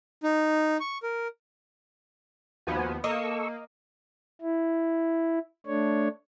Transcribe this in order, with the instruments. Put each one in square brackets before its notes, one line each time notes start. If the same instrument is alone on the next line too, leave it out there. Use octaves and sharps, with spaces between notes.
[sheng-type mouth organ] D#4
C#6
A#4
[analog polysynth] D#2 F3 B3 [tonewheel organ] F#4 B4 G#5
[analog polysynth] A#3 [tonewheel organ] A4 C#6 E6 [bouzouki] D#5
[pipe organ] E4
A3 D4 C#5